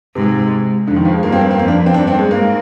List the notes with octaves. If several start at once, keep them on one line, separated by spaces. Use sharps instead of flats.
G#2 C3
F2 D3
D#3
F3
G#3
G2 A#3
C4
A#3
C4
F2 A#3
D4
C4
G2 D4
C4
G#3
G#2 A#3